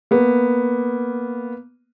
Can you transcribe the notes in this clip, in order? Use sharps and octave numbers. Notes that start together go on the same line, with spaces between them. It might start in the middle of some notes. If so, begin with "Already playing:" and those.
A#3 B3